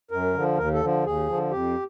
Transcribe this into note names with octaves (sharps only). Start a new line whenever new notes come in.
F#2 A#4
D3 F3
D#2 A#4
A4
D3 F3
D#2 G#4
D3 F3
F2 G4